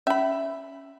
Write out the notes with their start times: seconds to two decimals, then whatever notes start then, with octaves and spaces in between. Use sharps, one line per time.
0.07 C#4 E5 B5